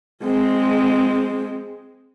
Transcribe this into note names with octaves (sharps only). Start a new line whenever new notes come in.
G#3 C4